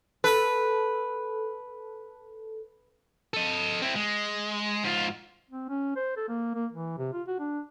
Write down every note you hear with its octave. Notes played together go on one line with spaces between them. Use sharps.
A4 B4
A4 D#5
C4 E4
G#3
G#2 F4
C4
C#4
C5
A4
A#3
A#3
E3
C3
F4
F#4
D4